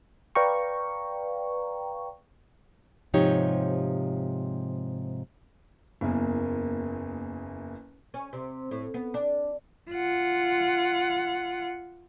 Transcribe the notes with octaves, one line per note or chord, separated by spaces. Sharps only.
B4 D5 F5 G5 A#5 C#6
G#2 C3 F3 D#4 G4 C#5
F#1 E2 A#3
C#4
C3
A2
B3
D4
F4 F#5